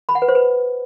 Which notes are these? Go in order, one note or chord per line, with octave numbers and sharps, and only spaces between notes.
B5
F#5
B4
C5
B4